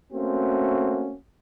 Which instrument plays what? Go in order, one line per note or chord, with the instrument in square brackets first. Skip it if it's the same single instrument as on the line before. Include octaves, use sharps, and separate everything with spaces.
[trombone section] A3 A#3 C4 C#4 F#4